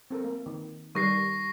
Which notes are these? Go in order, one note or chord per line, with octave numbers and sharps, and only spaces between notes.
C4 A4 A#4
A#3
D#3
D#3 G3 C#6 A#6 C7